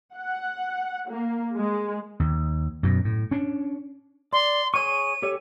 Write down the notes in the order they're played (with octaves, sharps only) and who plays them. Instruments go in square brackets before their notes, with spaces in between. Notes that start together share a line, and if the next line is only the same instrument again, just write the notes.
[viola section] F#5
A#3
G#3
[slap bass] D#2
F#2 B2
A2
C#4 D4
[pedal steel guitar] D5 [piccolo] C6
[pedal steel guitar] G#4 C#5 C#6 [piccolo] D#7
[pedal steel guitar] G4 A4 C#5